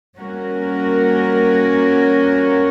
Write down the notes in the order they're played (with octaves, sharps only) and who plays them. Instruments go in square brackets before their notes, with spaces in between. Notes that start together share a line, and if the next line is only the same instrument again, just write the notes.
[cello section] G3 A#3 C#4 F#4 A#4